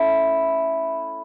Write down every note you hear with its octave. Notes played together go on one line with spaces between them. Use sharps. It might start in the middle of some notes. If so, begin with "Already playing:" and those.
Already playing: A3 C#4 E4 E5